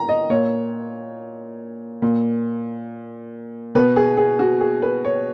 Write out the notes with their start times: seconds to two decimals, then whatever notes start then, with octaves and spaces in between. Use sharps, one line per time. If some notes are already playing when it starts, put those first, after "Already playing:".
Already playing: A#5
0.09 D#5
0.30 A#2 C#5
2.02 A#2
3.75 B2 B4
3.96 G#4
4.17 G#4
4.39 F#4
4.61 G#4
4.82 B4
5.05 C#5